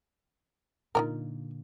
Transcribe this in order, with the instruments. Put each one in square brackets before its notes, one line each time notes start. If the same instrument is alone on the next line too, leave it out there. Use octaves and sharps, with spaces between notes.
[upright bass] A#2 D3 [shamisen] D#4 F4 A#4